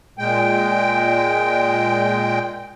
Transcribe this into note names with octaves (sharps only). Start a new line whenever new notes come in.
A#2 G#3 G5